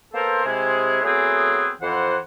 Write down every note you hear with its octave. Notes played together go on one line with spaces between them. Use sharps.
A#3 B3 A4 A#4 C5
C3 G#3 E4 G#4
F#3 A3 B3 C4 G#4
F2 E3 C5 F#5